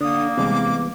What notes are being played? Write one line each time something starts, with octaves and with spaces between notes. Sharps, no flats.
D3 A#3 D#6
E2 C3 G3 G#3 D6